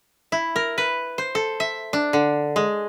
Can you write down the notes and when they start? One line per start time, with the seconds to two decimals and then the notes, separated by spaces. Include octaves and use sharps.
0.32 E4
0.56 A#4
0.78 B4
1.18 C5
1.35 A4
1.60 E5
1.93 D4
2.13 D3
2.56 G#3